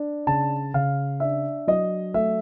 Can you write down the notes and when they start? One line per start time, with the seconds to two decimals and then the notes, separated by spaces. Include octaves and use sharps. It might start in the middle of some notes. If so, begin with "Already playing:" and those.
Already playing: D4
0.27 C#3 A5
0.74 C#3 F5
1.20 D4 E5
1.67 F#3 D#5
2.14 A3 E5